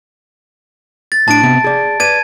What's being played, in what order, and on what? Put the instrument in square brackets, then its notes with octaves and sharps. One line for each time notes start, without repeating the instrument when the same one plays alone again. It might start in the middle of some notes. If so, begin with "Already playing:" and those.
[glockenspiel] A6
[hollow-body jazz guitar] A2 D4 [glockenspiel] A5 D7
[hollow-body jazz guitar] C3 B3
G#4 D5
[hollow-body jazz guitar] B4 D5 [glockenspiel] G#6 D#7